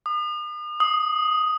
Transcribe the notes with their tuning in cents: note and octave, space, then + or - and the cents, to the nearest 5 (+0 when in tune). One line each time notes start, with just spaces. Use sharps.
D#6 -40
D#6 +5